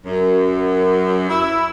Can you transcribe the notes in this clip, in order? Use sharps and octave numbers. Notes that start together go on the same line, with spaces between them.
F#2
E4